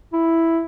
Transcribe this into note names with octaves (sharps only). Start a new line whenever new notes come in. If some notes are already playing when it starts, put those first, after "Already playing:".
E4